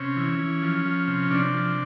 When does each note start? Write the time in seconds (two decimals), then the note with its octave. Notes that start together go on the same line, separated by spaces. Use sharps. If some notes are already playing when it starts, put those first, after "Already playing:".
Already playing: C3 C#4
0.16 E3
0.39 E3
0.62 F3
0.86 F3
1.07 C3
1.31 C3 D4
1.54 F3